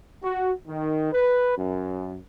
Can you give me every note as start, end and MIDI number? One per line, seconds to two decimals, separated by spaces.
0.22 0.51 66
0.67 1.10 51
1.12 1.54 71
1.57 2.16 42